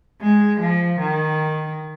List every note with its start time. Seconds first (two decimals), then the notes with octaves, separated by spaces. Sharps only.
0.22 G#3
0.60 F3
1.00 D#3